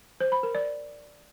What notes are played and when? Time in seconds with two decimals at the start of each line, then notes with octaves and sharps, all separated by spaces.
0.21 C5
0.32 B5
0.43 A#4
0.55 D5